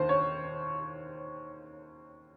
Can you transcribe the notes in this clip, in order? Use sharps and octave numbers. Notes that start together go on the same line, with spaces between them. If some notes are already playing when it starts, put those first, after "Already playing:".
Already playing: D#2 D#3 C5
C#5